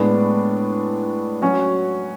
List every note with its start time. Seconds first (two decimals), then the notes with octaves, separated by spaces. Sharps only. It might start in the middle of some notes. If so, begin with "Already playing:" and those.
Already playing: A2 G#3 B3 D4
1.42 F#3 C#4 F#4